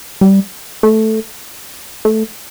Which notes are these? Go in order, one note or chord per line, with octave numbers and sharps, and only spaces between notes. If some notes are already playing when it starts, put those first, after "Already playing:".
G3
A3
A3